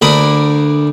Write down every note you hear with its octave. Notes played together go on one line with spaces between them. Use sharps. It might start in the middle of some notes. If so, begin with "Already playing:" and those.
D2 D4 A#4 B5 D#6